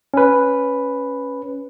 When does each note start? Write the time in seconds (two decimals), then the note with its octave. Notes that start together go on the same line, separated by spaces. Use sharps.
0.14 C#4 B4